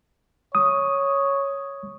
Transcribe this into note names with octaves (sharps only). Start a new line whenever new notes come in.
C#5 D#6